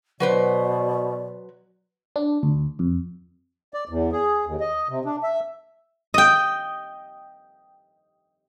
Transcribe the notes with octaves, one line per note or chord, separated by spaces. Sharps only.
B2 F#3 B4 C5 D5
D4
D2
F2
D5
E2
G#4
D#2
D#5
C3
D4
E5
D#5 G5